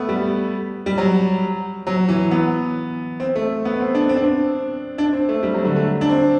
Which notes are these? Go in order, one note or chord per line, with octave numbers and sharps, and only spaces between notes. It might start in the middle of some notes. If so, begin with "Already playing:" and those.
Already playing: A3 B3
G3
G3
F#3
F#3
E3
B3
C4
A3
B3
C4
D4
C4
D4
C4
D4
C4
A3
G3
F#3
D3
A3
D4
C4